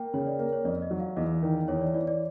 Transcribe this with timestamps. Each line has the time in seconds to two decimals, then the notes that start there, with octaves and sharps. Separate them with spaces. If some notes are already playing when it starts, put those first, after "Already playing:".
Already playing: A#3 G5
0.14 C#3 C#5
0.27 D5
0.39 A#3
0.53 C#5
0.65 F2 D5
0.82 D#5
0.91 F#3
1.00 F5
1.17 E2 D#5
1.42 D#3
1.68 E2 C#5
1.81 D5
1.94 E3 D5
2.07 D5